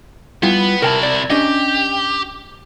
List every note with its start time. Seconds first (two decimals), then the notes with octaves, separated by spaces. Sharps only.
0.43 G3 B3 E4 F4
0.82 C3 E4 A#4 G5 A5
1.03 D5
1.30 C#4 D4 G4 D#5